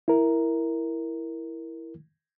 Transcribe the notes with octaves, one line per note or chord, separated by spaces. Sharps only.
E4 A#4